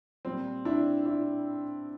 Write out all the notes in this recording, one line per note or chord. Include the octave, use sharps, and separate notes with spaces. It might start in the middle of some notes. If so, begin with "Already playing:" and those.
A#2 G3 C4
D4 E4
D4 E4